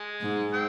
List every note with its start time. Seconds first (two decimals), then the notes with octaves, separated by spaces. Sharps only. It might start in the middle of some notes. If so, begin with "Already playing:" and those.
Already playing: G#3
0.21 G#2
0.53 C4